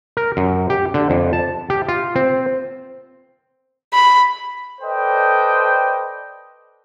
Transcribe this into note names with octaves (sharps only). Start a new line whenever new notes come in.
A#4
F#2
G4
D3
F2
A5
G4
F4
C4
B5
A4 B4 C5 D5 D#5 G5